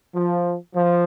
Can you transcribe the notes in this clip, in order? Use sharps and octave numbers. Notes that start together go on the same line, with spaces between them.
F3
F3